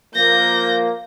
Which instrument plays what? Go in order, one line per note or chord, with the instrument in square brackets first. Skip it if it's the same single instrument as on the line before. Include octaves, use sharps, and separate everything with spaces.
[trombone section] F3 A#3 [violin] G6 A#6